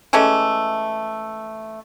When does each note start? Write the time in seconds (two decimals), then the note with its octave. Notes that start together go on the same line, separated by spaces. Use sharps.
0.13 E3 G#3 A3 C#4